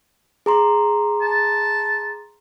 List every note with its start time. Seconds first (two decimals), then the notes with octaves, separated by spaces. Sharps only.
0.46 G#4 A#5 C6
1.22 A5